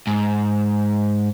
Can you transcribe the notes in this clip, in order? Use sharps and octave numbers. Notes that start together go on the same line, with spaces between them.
G#2